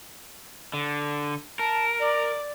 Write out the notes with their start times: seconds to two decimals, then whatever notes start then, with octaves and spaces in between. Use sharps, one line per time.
0.74 D3
1.59 A#4 A5
2.00 D5